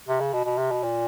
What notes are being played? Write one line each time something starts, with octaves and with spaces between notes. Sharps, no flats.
C3
C#3
B2
B2
C3
B2
A#2